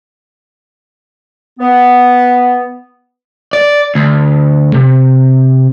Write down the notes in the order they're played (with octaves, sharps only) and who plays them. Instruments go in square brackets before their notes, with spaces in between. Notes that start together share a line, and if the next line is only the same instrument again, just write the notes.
[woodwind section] B3
[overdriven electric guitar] D5
D2
C3